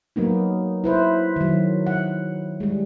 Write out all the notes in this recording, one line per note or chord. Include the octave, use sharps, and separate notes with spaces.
F#3 A#3 B3 D#4
E4 B4 C5
D#3 F#3
F#5
G3 G#3